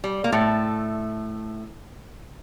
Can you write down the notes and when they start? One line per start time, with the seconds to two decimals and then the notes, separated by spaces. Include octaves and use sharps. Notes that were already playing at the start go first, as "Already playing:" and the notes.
0.04 G3
0.24 A#3
0.32 A2 A3